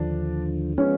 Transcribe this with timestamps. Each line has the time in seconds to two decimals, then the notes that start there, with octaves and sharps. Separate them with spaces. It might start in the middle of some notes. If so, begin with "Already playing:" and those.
Already playing: D#2 D3 F3 D4
0.78 F3 G#3 B3 C#4